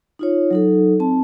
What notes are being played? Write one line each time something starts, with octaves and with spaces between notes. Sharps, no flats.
D#4 F4 C#5
F#3 D#4 A4
C4 A5